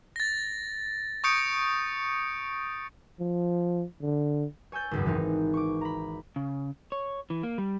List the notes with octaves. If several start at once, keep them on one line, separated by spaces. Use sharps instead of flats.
A6 A#6
C#6 D#6 G6 C#7 D7
F3
D3
C#5 G#5 E6 G6 A6
G#1 C#2 F#2
E3 B3 C4 D#4
C#6 D6
A#5 B5
C#3
C#5
E3
A#3
G3